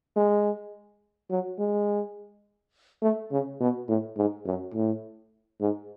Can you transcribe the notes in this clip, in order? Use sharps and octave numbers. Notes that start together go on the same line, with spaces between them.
G#3
F#3
G#3
A3
C#3
B2
A2
G#2
F#2
A2
G#2